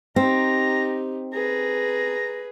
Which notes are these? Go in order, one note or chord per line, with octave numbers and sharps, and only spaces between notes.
C4 D#4 G4 A#5
G#4 B4 A#5